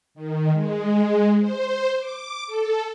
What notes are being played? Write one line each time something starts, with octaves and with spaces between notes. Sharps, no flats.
D#3
G#3
C5
D6
A4